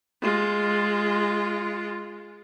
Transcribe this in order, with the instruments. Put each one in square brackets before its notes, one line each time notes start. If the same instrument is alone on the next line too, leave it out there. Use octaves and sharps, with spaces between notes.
[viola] G#3 F4